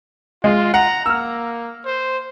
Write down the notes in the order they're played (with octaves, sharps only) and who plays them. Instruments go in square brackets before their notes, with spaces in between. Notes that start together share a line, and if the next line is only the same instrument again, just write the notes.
[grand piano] G#3 [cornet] F4
[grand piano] F#5 [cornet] A#5
[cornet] A#3 [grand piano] E6 F6
[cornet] C5